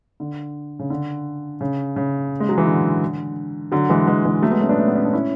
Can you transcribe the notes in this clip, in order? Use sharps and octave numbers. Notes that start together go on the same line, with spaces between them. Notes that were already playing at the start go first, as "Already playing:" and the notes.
D3
C#3
D3
C#3
C#3
G#3
F#3
E3
D3
D3 F#3
E3 G#3
E3 G#3
E3 G#3
F#3 A3
G#3 B3
A3 C#4
B3 D4
A3
B3
C#4
D4
C#4 E4